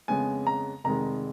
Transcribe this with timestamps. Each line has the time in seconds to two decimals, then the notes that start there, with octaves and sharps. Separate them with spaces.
0.08 F2 C#3 G#3 B3 G#5
0.47 A#5
0.84 F1 F2 D#3 G#3 A#5